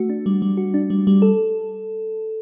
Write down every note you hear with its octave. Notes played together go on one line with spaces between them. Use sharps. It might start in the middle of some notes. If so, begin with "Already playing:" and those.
Already playing: A3 F#4
D4
G3
G3
F#4
D4
G3
G3
A4